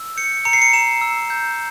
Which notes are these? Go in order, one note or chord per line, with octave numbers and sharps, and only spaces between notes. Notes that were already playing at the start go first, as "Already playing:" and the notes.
Already playing: E6
G6 C#7
A#5 C#7
C7
C#7
A#5 E7
E6
G6